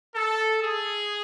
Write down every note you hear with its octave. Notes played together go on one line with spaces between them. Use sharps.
A4
G#4